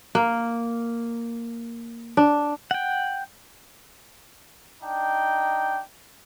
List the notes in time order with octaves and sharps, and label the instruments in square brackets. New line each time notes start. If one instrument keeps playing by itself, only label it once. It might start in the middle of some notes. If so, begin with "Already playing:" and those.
[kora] A#3
D4
[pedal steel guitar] F#5 G5
[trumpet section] D4 D#4 G5